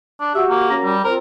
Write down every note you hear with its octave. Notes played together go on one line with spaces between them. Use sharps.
D4
F#4 G4 E5
A#3
F#2 C#4 A#5
G3
C4 F4 A#4